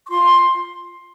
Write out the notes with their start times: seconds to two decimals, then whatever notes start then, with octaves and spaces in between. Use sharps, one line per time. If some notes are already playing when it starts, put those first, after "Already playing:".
0.06 C#6
0.10 F4 C6